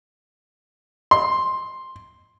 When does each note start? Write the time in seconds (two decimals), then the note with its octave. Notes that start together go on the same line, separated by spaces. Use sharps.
1.11 C6